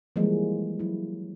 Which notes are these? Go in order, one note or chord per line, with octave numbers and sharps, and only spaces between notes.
E3 F3 G3 G#3 A#3
F#3 E4